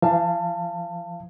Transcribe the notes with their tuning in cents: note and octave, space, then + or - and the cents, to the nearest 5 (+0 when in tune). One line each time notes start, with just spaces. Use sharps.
E3 +45 F5 -20 A5 +20